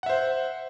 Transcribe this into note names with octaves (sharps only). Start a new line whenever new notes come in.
C5 E5 F#5